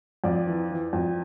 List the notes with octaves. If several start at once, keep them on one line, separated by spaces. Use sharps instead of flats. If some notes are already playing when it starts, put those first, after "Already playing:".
F2 D5
E3
E3
F2